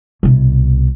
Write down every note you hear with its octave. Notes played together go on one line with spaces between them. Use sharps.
C2 B2